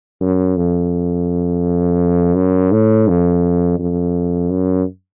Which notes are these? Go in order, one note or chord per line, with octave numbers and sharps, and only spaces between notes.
F#2
F2
F#2
A2
F2
F2
F#2